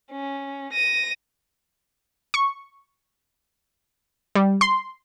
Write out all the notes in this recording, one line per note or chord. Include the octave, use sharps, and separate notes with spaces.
C#4
A#6 D#7
C#6
G3
C6